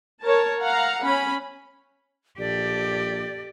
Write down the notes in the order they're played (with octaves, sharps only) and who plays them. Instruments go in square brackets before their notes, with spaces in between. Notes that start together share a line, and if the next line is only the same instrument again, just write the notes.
[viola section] A#4 C#5 A5
F5 F#5 A#5
C#4 B5
[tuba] A#1 [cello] G4 [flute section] A4 D5